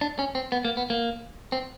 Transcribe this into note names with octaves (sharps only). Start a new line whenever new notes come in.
D4
C#4
C4
B3
A#3
B3
A#3
C4